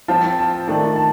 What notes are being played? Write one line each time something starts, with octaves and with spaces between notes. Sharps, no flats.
F3 C4 F4 A5
A5
D#3 A3 D4 A5
A5